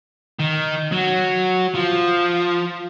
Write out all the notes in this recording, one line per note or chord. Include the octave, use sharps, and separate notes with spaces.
D#3
F#3
F3